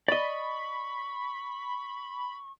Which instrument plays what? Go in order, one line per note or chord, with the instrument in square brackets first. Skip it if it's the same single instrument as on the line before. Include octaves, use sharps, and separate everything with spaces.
[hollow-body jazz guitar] D5 D#5 [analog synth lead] B5 [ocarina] C#6